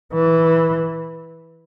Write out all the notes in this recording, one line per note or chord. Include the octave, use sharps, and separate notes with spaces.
E3